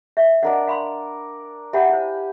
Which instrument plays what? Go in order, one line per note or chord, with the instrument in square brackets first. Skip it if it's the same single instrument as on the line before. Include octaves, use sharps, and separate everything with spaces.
[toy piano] E5
[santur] D4 A#4 D5 [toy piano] D#5 F#5
[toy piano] F5 B5 C6
[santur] G4 G#5 B5 [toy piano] E5 F#5
[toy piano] E4 C5